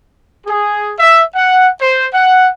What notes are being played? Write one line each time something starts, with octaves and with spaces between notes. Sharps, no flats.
G#4
E5
F#5
C5
F#5